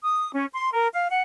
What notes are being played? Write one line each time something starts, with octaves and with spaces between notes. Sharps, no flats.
D#6
C#4
C6
A#4
F5
F#5